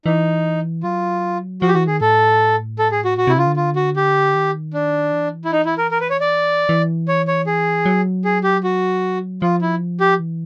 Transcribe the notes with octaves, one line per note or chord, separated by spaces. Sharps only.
E3 D#4
F#3 F4
F3 F#4
G4
E3 F#4
D#3 G#4
A2 A4
A4
G#4
F#4
A#2 F#4
C3 E4
C#3 F4
D3
F4
F#4
G4
D#3
D4
E3
E4
D#4
E4
A#4
A#4
B4
C#5
D5
E3
C#5
C#5
G#4
F#3
G#4
G4
F#4
F3 F4
E4
G4
E3